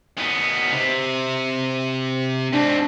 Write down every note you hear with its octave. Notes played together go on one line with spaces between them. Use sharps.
D#3 B3
C3
G#2 C4 D4